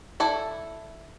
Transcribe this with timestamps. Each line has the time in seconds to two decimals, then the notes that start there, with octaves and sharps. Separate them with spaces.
0.20 E4 A4 D5